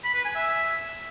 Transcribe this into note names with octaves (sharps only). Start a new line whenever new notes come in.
B5
B4
G#5
E5